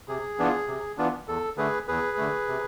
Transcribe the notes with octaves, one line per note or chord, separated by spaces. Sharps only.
C3 G#4
E3 B3 D4 F4
C3
E3 B3 D4 F4
E2 A4
D3 A3 G#4 B4
E2 G#4 B4
D3 A3
C3